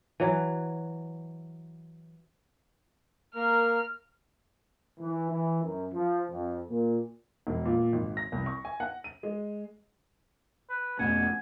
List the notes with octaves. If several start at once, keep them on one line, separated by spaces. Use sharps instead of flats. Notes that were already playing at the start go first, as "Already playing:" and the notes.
E3 F#3
A#3 A#4 F6
E3
E3
F#2
F3
F2
A#2
E1
A#2
G#1
A#6
C2
C#6
G#5
F#5
D#7
G#3
B4
F2 B2 A3 C#4 F#5 G#5